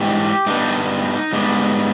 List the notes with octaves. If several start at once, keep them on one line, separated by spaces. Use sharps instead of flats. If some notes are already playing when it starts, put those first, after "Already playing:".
Already playing: G#2 E3 G3 G4
G2 G3 B3 D#4
G#2 G3 B3